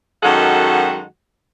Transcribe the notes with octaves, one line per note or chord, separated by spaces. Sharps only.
F#2 D#3 G#3 F#4 A4 F#5